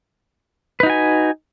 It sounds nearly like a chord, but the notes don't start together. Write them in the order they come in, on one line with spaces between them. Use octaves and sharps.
B4 D#4 F#4 G#5